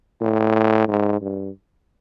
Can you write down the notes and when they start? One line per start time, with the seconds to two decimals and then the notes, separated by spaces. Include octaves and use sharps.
0.21 A2
0.88 G#2
1.21 G2